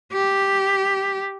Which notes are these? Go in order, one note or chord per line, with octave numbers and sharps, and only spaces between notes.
G4